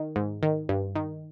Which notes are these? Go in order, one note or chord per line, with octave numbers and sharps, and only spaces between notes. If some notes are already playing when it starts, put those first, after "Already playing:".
Already playing: D#3
G#2
D#3
G2
D#3